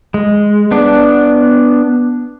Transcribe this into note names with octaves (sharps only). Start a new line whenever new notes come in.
G#3
B3 D4